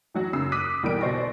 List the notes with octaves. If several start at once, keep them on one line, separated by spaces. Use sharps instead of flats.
E3 F#3 F#4
F#2 C#3 E6 C7
D6 D#6 F#6 B6 D#7
B1 E3 G3 A#4 D7
B2 F#4 C5 D5 C#6 A#6